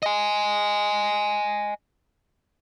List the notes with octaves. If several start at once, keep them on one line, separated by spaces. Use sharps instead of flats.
D#5 G#5